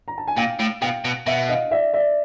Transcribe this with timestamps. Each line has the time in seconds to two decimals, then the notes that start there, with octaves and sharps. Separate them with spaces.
0.08 A#5
0.18 A5
0.27 G#5
0.37 A#2 F5 G5
0.60 A2
0.82 B2 F5 G5
1.05 B2
1.26 B2 E5 F#5
1.49 D#5 F5
1.71 D5 E5
1.93 D5 E5